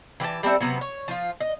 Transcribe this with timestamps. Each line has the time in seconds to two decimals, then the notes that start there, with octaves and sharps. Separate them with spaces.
0.20 E3 G4 B4 A5
0.43 G3 C4 A4 E5
0.61 C3 F#3 B3
0.81 C#5
1.08 F3 F4
1.40 D#5